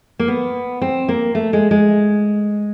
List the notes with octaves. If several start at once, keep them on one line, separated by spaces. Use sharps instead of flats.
A#3
B3
C4
A#3
A3
G#3
G#3